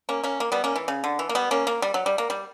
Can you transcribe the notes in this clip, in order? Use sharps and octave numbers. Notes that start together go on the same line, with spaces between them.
A#3 C#4
A#3 C#4
A#3
G3 B3
A#3 C#4
E3
C#3
D3
E3
A#3
G3 B3
A#3 C#4
A#3
G3
F#3
G3
A#3
G3